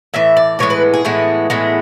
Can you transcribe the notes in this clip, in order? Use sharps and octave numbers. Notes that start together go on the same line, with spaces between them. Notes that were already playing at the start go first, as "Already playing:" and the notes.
A2 E3 E5
D5
A2 E3 G#3 B3 C#5
B4
G#4
A2 E3 G#3 B3
A2 E3 G#3 B3